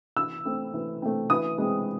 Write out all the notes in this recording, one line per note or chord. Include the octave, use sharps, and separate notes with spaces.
E3 E6
A3 C4
E3
A3 C4
E3 D#6
G#3 C4